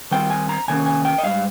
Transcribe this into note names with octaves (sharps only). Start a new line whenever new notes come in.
D#3 G3 C4 G5
G#5
A#5
C3 D#3 A#3 C#4 G#5
G#5
G5
D#5
G#2 G3 F5